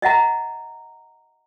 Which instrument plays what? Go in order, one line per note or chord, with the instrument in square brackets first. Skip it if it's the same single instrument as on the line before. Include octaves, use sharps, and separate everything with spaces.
[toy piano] D#5 E5 F#5 A#5